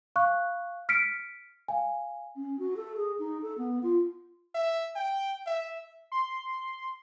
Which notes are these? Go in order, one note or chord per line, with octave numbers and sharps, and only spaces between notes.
F5 C#6 F#6
F6 B6 C#7 D7
F5 G#5
C#4
F#4
A4
G#4
D#4
A4
B3
F4
E5
G5
E5
C6